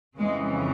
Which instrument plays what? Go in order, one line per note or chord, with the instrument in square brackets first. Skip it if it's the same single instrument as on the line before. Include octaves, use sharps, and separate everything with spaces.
[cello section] F2 C#3 E3 G#3